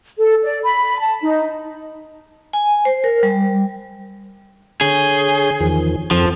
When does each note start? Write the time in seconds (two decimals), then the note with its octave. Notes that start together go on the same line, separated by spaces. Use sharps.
0.18 A4
0.44 D5
0.63 B5
0.99 A5
1.22 D#4
2.53 G#5
2.85 C5
3.04 A#4
3.23 G3
4.81 D3 G#4 C#5 G6
5.61 E2 D#3 F3
6.11 F2 F3 C4 A4